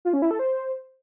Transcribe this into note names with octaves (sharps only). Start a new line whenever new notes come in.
F4
C#4
E4
A4
C5